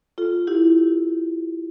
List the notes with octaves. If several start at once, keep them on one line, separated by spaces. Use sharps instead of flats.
F4 A4
E4 G4